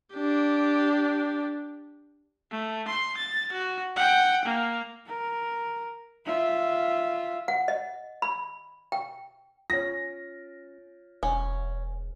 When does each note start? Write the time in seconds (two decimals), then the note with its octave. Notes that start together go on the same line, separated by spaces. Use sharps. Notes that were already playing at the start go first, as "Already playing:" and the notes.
0.15 D4 G4
2.51 A3
2.88 C6
3.18 A6
3.53 F#4
3.96 F#5 G5
4.45 A#3
5.07 A#4
6.25 F4 E5
7.48 F#5
7.68 D#5
8.22 B5
8.92 G5
9.70 C#4 F4 C#5 A#6
11.23 E1 C#4